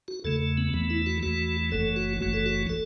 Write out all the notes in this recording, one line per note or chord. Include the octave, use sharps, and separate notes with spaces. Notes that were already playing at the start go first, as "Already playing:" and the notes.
F#4
E2 C#3 A3 A4
B3
E2 E3 A3 B3
E4
F#4
E2 E3 A3 F#4
F#1 F#2 E3 A3 A4
F#4
F#1 F#2 E3 A3 F#4
A4
F#4
A4